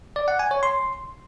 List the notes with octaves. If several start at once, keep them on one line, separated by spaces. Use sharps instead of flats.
D5
F#5
G#5
C#5
C6